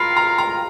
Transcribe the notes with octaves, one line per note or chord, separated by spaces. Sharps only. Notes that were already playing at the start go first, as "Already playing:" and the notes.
Already playing: F4 A#4 F5 B5
A#5
A#5